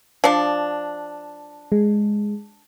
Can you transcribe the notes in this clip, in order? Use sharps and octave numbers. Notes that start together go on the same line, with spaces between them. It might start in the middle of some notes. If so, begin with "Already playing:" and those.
F3 D4
G#3